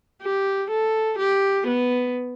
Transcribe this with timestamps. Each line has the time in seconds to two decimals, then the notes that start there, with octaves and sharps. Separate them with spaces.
0.22 G4
0.70 A4
1.18 G4
1.67 B3